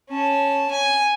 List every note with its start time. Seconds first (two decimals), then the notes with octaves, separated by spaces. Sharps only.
0.10 C#4 A5
0.71 G#5